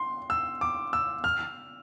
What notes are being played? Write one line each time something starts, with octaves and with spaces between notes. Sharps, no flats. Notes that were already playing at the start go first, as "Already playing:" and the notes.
Already playing: C6
E6
D6
E6
F6